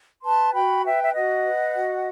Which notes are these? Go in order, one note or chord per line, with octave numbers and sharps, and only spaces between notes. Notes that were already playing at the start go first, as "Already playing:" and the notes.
B4 A5 C6
F#4 G5 B5
B4 E5 G5
E5
F#4 D#5 F#5
B4
F#4